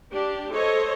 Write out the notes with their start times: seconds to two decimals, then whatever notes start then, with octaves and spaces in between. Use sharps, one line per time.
0.13 D4 G4
0.55 A4 C5 C#5 D#5